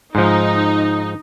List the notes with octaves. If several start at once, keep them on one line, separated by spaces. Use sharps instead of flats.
G#2 F3 D#4